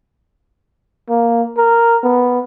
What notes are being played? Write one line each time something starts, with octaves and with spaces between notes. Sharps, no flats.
A#3
A#4
B3